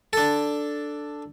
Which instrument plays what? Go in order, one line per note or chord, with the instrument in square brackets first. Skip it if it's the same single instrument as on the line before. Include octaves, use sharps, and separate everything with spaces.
[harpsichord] D4 A4